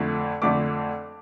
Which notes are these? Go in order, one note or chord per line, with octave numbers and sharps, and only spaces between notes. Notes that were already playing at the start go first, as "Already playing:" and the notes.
Already playing: F2 D3 A3
F2 D3 A3 D6